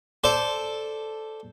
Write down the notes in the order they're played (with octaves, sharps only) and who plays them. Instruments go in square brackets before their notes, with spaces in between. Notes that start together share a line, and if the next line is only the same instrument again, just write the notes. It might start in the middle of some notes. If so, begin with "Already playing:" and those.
[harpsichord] A4 C5 D5